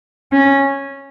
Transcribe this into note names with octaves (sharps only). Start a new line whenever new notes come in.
C#4